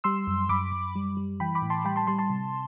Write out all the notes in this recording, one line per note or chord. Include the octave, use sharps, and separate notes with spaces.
G3 C6 E6
F#2
F#2 B5 D6
F#2
G3
G3
E3 G5 B5
B5 D6
A2
A5 C6
G3 G5 B5
A5 C6
G3 A5 C6
A5 C6
C3